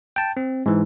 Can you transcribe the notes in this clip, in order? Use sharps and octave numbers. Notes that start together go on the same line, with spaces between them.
G5 A5
C4
G#2 E3